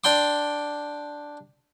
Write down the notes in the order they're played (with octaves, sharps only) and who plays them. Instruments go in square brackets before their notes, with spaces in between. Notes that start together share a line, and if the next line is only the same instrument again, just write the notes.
[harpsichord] D4 G5 C6 D6